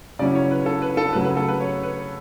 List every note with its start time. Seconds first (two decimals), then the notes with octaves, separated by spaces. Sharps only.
0.19 C#3 F#3 C#4 E4 D5
0.35 C#5
0.51 B4
0.66 A4
0.82 B4
0.97 A4
1.13 C#3 F#3 A3 B4
1.24 B4
1.37 A4
1.48 B4
1.60 C#5
1.83 B4